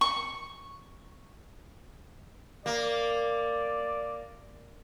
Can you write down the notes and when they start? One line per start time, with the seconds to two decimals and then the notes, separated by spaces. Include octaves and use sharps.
0.01 C#6
2.66 A#3 D5